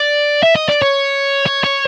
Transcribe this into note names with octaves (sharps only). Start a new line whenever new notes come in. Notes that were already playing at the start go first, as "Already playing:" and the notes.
Already playing: D5
E5
D#5
D5
C#5
C#5
C#5